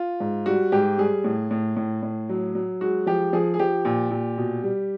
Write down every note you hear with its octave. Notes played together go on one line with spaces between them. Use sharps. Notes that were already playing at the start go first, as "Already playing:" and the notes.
Already playing: F4
G#2
G3 F#4
G#2 G4
G3 G#4
A2
A2
A2
A2
F#3
F#3
G#3 F#4
F3 G4
F3 G#4
G#4
F3 G4
A#2
A#2
B2
G3